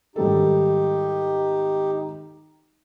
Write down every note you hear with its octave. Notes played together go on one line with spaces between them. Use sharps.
G#1 G3 D#4 G4 A4